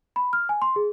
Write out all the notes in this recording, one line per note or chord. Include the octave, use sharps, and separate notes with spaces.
B5
F6
G#5
C6
G#4